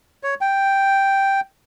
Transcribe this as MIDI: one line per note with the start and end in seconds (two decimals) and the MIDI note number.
0.23 0.34 73
0.41 1.41 79